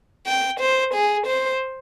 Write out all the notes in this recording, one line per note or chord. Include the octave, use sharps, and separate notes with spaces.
G5
C5
G#4
C5